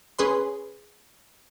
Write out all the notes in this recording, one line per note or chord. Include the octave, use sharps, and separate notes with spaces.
C#4 G#4 B4 C6